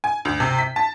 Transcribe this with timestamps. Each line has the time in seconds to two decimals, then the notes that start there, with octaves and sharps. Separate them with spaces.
0.04 G#5
0.25 D2
0.40 C3
0.59 B6
0.76 A5